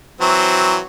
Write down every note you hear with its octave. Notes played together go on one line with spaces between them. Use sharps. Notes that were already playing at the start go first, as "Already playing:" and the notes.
E3 F#3 C4